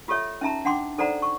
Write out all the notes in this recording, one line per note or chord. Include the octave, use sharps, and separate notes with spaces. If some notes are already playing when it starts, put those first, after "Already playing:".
F4 G4 A4 C#5 E5
C#4 D#4 E5 A5 A#5
D4 F#5 G5 C6 D6
D#4 A4 C5 D5 F#5 A#5
C#6